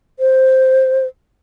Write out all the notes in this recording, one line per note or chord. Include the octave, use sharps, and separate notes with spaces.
C5